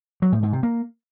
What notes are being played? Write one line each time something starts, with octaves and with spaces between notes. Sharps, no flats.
F#3
A2
G#2
C3
A#3